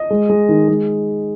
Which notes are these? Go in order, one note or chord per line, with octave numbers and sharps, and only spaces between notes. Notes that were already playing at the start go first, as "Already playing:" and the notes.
Already playing: D#5
G#3
G#3
D#3
G#3